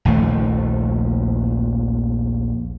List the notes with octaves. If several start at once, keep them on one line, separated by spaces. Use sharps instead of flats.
A#1 D#2 F3 A3